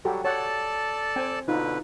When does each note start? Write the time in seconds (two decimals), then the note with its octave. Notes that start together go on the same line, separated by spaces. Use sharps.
0.05 F#3 G3 F#4 G4 A4
0.24 A4 C#5 D5 F#5 A5
1.16 C4 G5 G#5
1.48 B2 D3 D#4 F4 B4